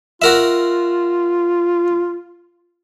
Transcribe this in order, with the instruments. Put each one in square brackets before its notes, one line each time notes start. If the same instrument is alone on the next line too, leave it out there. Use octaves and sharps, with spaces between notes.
[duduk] F4 [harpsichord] F#4 A#4 E5